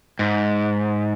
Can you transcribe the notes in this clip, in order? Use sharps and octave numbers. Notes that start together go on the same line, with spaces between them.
G#2